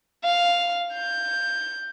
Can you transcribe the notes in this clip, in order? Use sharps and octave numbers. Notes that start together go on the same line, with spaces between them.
F5
G6